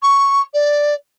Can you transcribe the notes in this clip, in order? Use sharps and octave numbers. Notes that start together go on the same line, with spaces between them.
C#6
D5